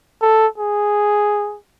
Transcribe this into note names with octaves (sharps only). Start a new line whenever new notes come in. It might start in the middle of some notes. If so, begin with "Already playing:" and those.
A4
G#4